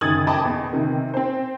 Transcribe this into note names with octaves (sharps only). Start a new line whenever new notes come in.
F#1 D#3 D#6 G#6 A6 F#7
D#5 G5 A5 B5 D6
E2
C3 D#3
C4 C5